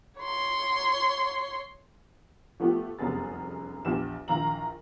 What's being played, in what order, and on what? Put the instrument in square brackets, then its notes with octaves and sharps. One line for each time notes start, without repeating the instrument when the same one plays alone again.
[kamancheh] C#5 C6
[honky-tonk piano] F3 A3 B3 G4
F1 F#2 G3 B3 G#4 A6
A#1 E2 B3 G4 E7
A#1 D#3 E3 F5 A#5 F#7